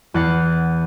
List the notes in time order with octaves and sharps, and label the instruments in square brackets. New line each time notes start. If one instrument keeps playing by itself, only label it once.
[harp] E2 F#5 A6 C7